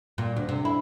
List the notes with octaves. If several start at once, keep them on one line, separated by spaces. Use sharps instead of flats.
A#2
D2
C3
E4